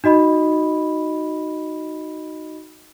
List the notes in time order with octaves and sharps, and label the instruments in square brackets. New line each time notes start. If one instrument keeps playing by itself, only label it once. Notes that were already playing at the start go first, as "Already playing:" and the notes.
[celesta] D#4 F#4 D#5 B5